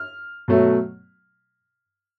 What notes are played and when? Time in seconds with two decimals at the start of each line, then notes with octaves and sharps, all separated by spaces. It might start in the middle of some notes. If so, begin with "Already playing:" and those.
Already playing: F6
0.48 B2 F#3 A3